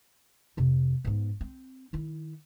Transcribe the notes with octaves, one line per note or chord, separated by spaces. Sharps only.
F2 C3
G#2 B3
C4
D#3 E4